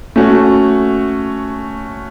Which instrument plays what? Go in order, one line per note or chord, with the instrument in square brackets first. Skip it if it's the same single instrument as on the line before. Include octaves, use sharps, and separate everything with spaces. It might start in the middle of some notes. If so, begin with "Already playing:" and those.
[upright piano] A3 C#4 F#4